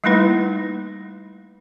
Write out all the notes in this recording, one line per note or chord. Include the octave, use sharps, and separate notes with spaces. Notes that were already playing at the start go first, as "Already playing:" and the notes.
G3 A3 A#3 D#4 E4 B4